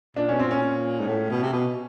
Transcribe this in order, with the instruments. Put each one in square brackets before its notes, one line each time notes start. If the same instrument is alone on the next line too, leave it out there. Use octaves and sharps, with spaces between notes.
[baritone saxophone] A#2 [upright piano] D4
[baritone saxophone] B2 [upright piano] C#4
[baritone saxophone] A#2 [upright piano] C4
[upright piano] C#4
[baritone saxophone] G#2
A2
B2
C3
B2